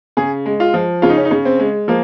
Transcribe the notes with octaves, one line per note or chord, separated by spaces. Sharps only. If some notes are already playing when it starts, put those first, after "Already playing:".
C#3 G#4
G#3
F4
F3
C#3 F4
D#4
C#4
D#4
C#3
C4
G#3
F3 A#3